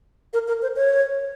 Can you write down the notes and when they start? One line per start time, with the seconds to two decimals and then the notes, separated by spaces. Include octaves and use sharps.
0.33 A#4
0.48 A#4
0.62 C5
0.76 C#5